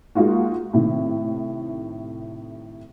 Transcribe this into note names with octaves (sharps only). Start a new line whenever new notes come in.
G#3 A#3 D#4 F4 F#4
A2 C3 D#3